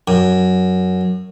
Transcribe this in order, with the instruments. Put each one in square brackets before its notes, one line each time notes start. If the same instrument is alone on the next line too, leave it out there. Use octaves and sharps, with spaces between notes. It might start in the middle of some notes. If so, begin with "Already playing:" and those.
[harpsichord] F#2